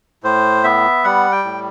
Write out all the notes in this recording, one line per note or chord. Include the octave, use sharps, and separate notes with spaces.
A2 C5
B3 E5
G3 F#5
G5
A2